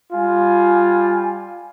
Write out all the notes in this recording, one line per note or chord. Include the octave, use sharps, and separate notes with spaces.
G3 F4 G#5